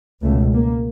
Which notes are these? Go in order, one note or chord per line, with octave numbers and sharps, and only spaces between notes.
C#2 B2 A3
A#3